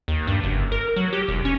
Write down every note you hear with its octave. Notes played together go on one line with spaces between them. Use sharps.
D#2
G2
F#1
A#4
F#3
G4
E1
C#4